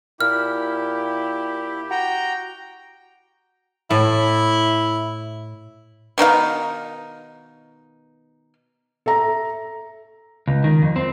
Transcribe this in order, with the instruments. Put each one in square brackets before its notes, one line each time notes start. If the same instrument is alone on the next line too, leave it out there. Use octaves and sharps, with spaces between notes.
[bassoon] A#2 [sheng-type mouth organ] E4 [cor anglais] G4 [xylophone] F6
[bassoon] F#4 [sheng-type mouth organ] G5 A#5
[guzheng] A2 [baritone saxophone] E4
[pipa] B2 D#3 D#4 F5
[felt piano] A4 E5 A#5
[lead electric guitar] C#2
D#3
F2
C4